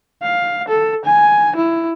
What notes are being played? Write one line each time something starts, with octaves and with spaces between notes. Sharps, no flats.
F5
A4
G#5
E4